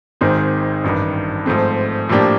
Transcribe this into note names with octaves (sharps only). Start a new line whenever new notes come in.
G#1 G#2 D#3 G#3 C4
A1 G2 D#3
G#2 F3 A3 C4
A2 F3 A#3 D4 G4